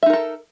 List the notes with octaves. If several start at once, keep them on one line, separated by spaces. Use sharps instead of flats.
D#4 A4 A#4 E5